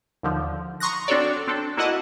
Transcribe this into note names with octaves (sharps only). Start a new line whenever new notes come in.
D#2 D3 F3
A#5 C6 C#6 D#6 F#6 A#6
C4 D4 F#4 A4 C#5 D5
C4 D4 A4
A#3 E4 F#4 D#5 F#5 A5